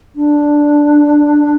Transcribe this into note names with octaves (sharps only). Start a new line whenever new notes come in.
D4